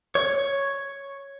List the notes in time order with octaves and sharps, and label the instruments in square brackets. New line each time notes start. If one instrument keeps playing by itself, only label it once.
[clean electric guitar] C#5